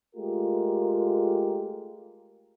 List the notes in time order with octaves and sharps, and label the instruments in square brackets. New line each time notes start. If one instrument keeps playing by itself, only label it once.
[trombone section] G#3 A3 F4 G4 A#4